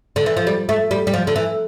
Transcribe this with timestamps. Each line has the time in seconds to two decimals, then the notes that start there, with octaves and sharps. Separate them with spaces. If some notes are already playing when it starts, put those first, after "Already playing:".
0.16 D3
0.26 E3
0.37 F3
0.47 G3
0.69 A3
0.91 G3
1.07 G3
1.14 F3
1.27 D3
1.36 E3